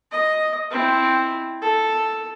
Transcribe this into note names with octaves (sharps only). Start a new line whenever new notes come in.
D#5
C4 E4
A4